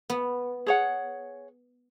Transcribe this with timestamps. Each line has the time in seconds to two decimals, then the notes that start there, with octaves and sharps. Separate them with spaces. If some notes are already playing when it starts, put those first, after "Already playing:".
0.10 B3
0.66 G#4 C#5 F#5